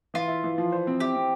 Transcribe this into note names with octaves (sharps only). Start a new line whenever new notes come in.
E3 F4
E4
E3
F3
C5
C4
E4 G4
C4